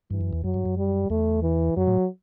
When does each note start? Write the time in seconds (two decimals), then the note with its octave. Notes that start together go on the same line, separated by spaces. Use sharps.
0.11 G2 E3
0.21 F#2
0.33 E2
0.44 F#2 F#3
0.54 G2
0.65 F#2
0.77 G3
1.10 E2 A3
1.42 E3
1.77 F#2 F#3
1.87 A2